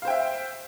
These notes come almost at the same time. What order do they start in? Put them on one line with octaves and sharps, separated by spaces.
F5 C5 G5 E5